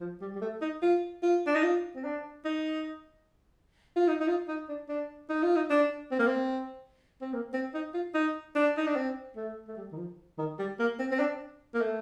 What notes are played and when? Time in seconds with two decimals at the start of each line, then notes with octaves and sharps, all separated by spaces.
0.01 F3
0.21 G3
0.35 G3
0.41 A3
0.61 D#4
0.82 F4
1.23 F4
1.47 D4
1.55 D#4
1.63 F4
1.95 C4
2.04 D4
2.45 D#4
3.96 F4
4.08 D#4
4.20 D#4
4.28 F4
4.48 D#4
4.69 D4
4.89 D4
5.29 D#4
5.43 F4
5.56 D#4
5.70 D4
6.11 C4
6.19 A#3
6.27 C4
7.21 C4
7.33 A#3
7.54 C4
7.74 D#4
7.94 F4
8.14 D#4
8.55 D4
8.77 D#4
8.87 D4
8.96 C4
9.36 A3
9.68 A3
9.77 G3
9.92 D#3
9.97 F3
10.38 D#3
10.59 G3
10.79 A#3
10.99 C4
11.11 C4
11.19 D4
11.74 A#3
11.81 A3